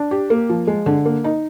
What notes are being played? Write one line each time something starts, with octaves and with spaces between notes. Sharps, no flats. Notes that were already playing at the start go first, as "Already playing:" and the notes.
Already playing: D4
G4
A#3
F3
G#3
D3
A#3
D#4